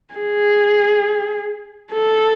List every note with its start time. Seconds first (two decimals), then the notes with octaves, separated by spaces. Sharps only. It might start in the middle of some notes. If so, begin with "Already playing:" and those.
0.14 G#4
1.92 A4